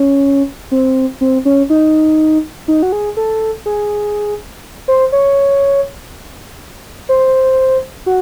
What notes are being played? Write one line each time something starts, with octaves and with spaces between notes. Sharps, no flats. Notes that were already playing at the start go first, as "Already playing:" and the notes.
Already playing: C#4
C4
C4
C#4
D#4
D#4
F#4
G#4
A4
G#4
C5
C#5
C5
F#4